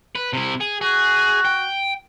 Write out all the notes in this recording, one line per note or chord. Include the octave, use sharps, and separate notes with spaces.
B4
C3 E4
G#4
F#4 G#4
G5